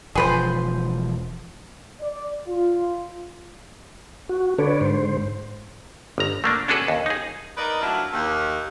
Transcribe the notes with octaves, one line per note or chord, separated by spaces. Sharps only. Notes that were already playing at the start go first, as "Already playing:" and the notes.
E1 F3 G#4 B4 C5
D5
F4
F#4
D3 B4 C#5 D5
G#2 C5
G1 A#5
A3 A#3 D4
C#4 D4 F#4 G#4 A4 B4
D#2
D#4 G#4
D#4 A#4 B4 D5 D#5
F#3 A3 D4 E4 F4
D#2